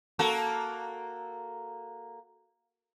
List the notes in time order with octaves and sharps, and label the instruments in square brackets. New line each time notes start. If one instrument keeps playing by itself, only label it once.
[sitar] A#3 F#4 A4